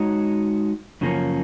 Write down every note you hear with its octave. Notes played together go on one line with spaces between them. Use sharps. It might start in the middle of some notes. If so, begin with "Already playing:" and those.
Already playing: G#3 D#4 F#4 C#5
F#2 C#3 F3 A#3 C#4